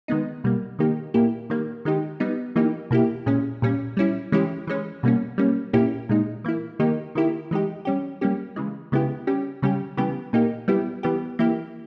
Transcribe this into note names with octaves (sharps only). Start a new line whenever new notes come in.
D#3 G#3 B3 D#4
B2 G3 A#3
D#3 A#3 D#4 G4
A#2 A#3 E4 G4
D#3 G3 A#3
D#3 G#3 D#4 G4
G3 B3 D#4
E3 A#3 D#4 G4
B2 A#3 E4 G4
A#2 G#3 C#4
A#2 G3 C#4
G3 C#4 E4
E3 G#3 C#4 E4 G4
E3 G#3 C#4
B2 G3 A#3 C#4
G3 A#3 C#4
A#2 A#3 C#4 E4 G4
A#2 G#3 D#4
E3 A#3 E4
D#3 A#3 D#4 G4
D#3 A#3 E4 G4
E3 G#3 D#4 G4
G3 C#4 G4
G3 A#3 C#4 G4
C#3 E3 G#3
C#3 G#3 B3 E4 G4
G3 C#4 G4
C#3 G3 C#4 G4
C#3 E3 G3 B3 G4
A#2 A#3 D#4 G4
G3 B3 E4 G4
E3 G3 B3 G4
E3 A#3 E4 G4